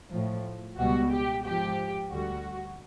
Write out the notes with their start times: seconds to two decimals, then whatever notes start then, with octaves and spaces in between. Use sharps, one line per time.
0.12 A2 F3
0.78 C#2 B2 G3 F#4
1.11 G4
1.44 G#2 F3 G4
2.10 D2 D3 G3 F#4